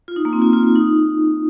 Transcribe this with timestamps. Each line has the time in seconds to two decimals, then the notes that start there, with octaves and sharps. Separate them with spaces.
0.08 F4
0.16 D#4
0.25 A#3
0.33 C4
0.42 F4
0.53 F4
0.63 F4
0.75 D#4